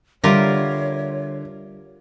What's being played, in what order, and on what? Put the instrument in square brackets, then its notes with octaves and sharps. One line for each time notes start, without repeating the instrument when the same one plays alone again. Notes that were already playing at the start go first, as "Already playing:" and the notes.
[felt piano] D3 [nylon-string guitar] G3 E5 [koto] F4 G4 A#4 [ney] C#5